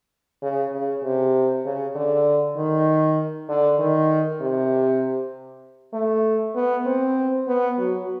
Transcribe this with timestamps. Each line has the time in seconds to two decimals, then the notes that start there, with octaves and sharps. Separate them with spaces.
0.43 C#3
0.73 C#3
1.04 C3
1.65 C#3
1.95 D3
2.57 D#3
3.49 D3
3.79 D#3
4.41 C3
5.93 A3
6.56 B3
6.86 C4
7.47 B3
7.78 F#3